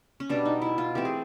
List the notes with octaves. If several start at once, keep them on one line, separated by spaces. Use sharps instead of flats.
C#4
B2 G3 B3 D4
D#4
E4
F4
E3 A3 C4 G4
G#4